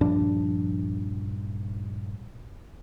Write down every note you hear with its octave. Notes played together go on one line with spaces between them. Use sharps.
A#1 G2 F3 D4